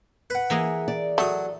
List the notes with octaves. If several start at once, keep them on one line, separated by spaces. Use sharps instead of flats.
B4 F#5
E3 A#3 G#4
D5
F#3 A3 D#6